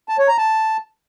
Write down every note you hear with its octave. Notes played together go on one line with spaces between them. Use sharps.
A5
C#5
A#5
A5